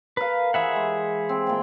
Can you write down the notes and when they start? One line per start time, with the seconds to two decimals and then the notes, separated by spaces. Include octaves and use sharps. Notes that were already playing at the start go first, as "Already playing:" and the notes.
0.17 A#4 B4 F5
0.54 E3 G#4 C5 E5 F#5
0.76 G#3
1.29 C4
1.47 A#2 G5